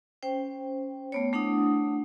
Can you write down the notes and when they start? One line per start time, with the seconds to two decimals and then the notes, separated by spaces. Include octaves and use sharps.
0.23 C#4 C5 G5
1.12 A3 B3 C#5
1.33 A3 D4 E4 F#5 D#6